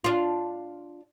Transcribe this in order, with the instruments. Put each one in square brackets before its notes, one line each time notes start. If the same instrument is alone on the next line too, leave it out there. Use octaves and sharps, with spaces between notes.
[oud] D4 F4